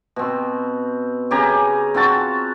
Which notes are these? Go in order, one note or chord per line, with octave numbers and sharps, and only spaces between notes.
B2 C4
C#3 G4 G#5 A#5
G#5
C4 F4 F#4 A5